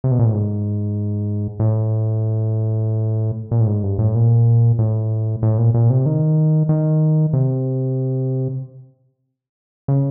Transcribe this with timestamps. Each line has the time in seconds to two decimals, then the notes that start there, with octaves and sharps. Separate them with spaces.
0.04 C3
0.11 B2
0.19 A#2
0.26 A2
0.33 G#2
1.60 A2
3.51 A#2
3.61 A2
3.67 G#2
3.83 G2
3.99 A2
4.15 A#2
4.79 A2
5.43 A2
5.58 A#2
5.74 A#2
5.90 C3
6.06 D#3
6.69 D#3
7.33 C3
9.88 C#3